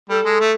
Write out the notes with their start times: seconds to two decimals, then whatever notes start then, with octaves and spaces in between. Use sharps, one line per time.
0.09 G3 A4
0.25 G#3
0.40 A3